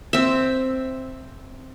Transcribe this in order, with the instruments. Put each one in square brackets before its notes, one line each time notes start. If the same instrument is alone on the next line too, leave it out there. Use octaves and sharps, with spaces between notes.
[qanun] C4 E5